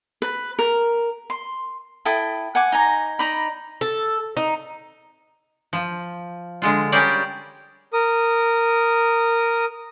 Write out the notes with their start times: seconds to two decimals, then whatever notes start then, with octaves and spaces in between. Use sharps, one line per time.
0.22 B4
0.59 A#4
1.30 C6
2.05 E4 A4 G5 D#6
2.55 F#5 G#5 D6
2.72 D#4 G#5 A#5
3.19 D#4 D5 A#5 B5
3.81 A4
4.37 D#4
5.73 F3
6.62 D3 G#3 F4
6.92 G3 C#4 G4 G#4 A#4 D5
7.93 A#4 D#6